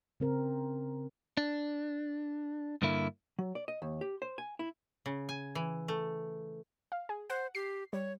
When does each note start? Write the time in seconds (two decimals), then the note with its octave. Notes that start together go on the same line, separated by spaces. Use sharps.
0.20 C#3 C4 A#4
1.37 D4
2.82 G2 D3 A#3 E4
3.39 F#3
3.55 D5
3.68 D#5
3.82 D#2
4.01 G4
4.22 C5
4.38 G#5
4.59 E4
5.06 C#3
5.29 G#5
5.55 E3
5.88 A3
6.92 F5
7.09 G#4
7.30 C5 F#5
7.55 G4 C7
7.93 G3 C#5